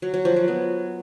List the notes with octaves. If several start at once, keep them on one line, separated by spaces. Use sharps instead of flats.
F#3
F#3
F3
F#3
B3